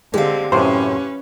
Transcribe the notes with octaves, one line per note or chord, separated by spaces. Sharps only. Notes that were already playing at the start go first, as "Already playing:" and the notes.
D3 G#3 C4 G4 F5
F#2 A2 C3 C#4 B4 C5